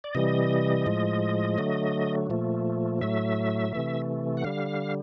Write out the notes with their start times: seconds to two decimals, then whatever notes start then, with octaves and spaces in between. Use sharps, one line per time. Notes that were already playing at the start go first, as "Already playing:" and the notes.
0.04 D5
0.15 C3 E3 G3 D#5
0.86 A2 F3 G#3
1.58 D3 F#3 A3
2.30 A#2 F3 A3
3.01 A2 F#3 A3 E5
3.73 C3 E3 A3
4.37 F#5
4.44 D3 G3 F5